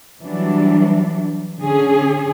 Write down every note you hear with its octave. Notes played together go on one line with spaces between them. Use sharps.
E3 F#3 G3 D4
D3 C#4 G#4